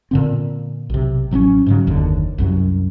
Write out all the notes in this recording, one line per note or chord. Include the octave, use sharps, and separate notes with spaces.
A#2 D3 C4
B1 C3
A1 F#3 A3 C#4
G#2 C#3 F#3
F#1 D#2 D3
C2 F#2 F#3